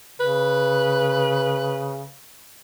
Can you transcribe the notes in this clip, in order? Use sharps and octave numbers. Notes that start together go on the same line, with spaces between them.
C#3 B4